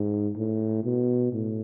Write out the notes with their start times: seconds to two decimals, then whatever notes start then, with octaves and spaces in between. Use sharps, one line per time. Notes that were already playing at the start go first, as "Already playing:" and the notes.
Already playing: G#2
0.36 A2
0.84 B2
1.33 A2